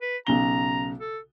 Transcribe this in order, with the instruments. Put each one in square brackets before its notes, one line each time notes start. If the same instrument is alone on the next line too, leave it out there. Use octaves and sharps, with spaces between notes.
[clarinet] B4
[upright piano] B1 C#3 G7 [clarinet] A#5
[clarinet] A4